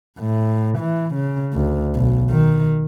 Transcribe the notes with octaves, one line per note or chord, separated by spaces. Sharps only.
A2
E3
C#3
D2
B1
D#3